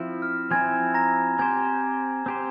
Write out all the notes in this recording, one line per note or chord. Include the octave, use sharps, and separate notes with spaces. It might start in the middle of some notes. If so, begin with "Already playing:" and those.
Already playing: F3 C4 E4
F6
F3 C4 E4 G#5 G#6
A#5 A#6
C4 G4 C5 G#5 G#6
C4 G4 C5